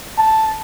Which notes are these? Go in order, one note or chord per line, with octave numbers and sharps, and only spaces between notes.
A5